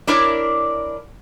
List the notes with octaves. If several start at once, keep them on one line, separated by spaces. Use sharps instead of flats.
D4 E4 A#4 C#5 D5